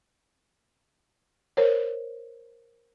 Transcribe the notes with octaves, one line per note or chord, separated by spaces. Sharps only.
A#4 C5 C#5